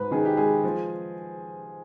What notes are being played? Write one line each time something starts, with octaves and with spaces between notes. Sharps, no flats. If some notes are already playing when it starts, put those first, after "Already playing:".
Already playing: G#2 G#3 B4
D#3 G#4
G4
G#3 G#4
F3